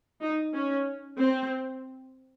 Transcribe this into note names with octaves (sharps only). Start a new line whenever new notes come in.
D#4
C#4
C4